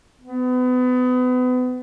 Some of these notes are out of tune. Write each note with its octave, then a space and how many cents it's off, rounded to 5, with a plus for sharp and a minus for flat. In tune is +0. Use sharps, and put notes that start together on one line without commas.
B3 +30